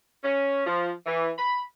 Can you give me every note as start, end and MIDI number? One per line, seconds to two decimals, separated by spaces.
0.23 0.63 61
0.66 0.91 53
1.06 1.30 52
1.38 1.62 83